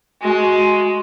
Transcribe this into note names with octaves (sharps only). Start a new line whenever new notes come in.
G#3 F#4